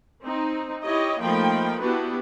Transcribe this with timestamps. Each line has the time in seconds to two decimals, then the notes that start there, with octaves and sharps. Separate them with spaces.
0.23 C4 D#4
0.82 E4 G4 C#5 D#5
1.21 F3 A3 A#3 D#4 G5 B5
1.80 B3 D4 E4 F#4 G4 B4